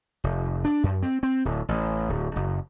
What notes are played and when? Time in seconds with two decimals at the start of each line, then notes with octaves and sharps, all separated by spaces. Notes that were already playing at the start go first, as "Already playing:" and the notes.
0.24 F1
0.65 D4
0.83 F#2
1.03 C4
1.23 C4
1.45 D1
1.69 A1
2.09 D1
2.36 F#1